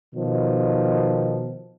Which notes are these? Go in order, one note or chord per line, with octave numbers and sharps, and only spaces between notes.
B2 D#3 F3